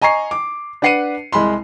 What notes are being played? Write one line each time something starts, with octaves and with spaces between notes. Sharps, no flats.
D#5 G#5 A#5 C#6 C7
D6
D4 B4 F#5 C7 C#7 D#7
C2 G#3 B5 C6